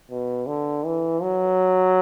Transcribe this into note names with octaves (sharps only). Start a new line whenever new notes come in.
B2
D3
E3
F#3